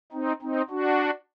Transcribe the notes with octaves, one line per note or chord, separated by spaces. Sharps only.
C4 D#4
C4 D#4
D4 F#4